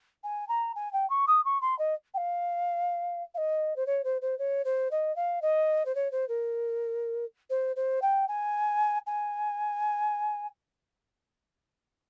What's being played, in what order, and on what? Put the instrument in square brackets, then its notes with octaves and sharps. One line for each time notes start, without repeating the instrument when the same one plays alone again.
[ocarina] G#5
A#5
G#5
G5
C#6
D#6
C#6
C6
D#5
G5
F5
F5
D#5
C5
C#5
C5
C5
C#5
C5
D#5
F5
D#5
C5
C#5
C5
A#4
C5
C5
G5
G#5
G#5